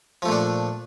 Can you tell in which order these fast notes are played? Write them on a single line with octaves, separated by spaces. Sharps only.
F3 A3 A#2 D4